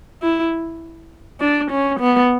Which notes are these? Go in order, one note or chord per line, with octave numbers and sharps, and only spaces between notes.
E4
D4
C#4
B3